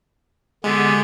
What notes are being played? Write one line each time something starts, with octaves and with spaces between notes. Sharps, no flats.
D3 G#3 B3 G4